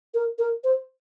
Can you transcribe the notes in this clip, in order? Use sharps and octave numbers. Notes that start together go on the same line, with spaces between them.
A#4
A#4
C5